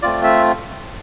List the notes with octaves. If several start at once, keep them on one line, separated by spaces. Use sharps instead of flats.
A3 C4 F4 D5
E5